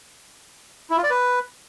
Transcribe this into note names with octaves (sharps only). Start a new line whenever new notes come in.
E4
F4
D5
B4